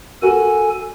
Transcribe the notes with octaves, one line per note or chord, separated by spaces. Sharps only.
F#4 A4 A#4 G#5